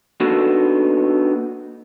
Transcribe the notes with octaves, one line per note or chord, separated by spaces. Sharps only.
A#3 B3 D4 D#4 F#4 A4